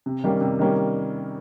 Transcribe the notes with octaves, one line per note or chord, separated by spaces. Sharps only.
C3
D#3 G3 A#3 C#4
C3
D#3 G3 A#3 C#4